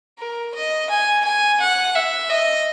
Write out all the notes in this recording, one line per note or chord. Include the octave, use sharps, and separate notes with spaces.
A#4
D#5
G#5
G#5
F#5
E5
D#5